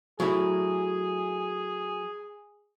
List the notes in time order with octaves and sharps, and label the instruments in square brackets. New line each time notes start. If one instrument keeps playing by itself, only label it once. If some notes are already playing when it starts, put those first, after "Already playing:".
[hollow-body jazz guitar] F#3 A3 E4 [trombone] G#4